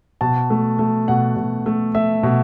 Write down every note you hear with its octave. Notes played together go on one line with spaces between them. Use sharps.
B2 A5
A3
A3
B2 F#5
B2
A3
A3 E5
B2